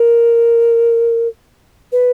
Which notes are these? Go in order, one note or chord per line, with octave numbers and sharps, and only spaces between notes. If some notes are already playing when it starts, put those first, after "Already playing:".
Already playing: A#4
B4